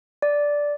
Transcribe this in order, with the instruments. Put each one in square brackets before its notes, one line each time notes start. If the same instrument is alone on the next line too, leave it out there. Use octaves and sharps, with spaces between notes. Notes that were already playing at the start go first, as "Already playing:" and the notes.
[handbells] D5